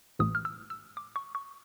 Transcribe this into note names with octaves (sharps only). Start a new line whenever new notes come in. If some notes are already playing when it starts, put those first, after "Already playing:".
A1 A2 E3 A3 D#6
F6
E6
E6
D6
C#6
C#6